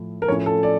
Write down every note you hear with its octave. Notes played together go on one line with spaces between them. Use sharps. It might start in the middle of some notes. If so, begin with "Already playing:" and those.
Already playing: A2 F3
A#4
A2 F3 C#4 C#5
A4
D5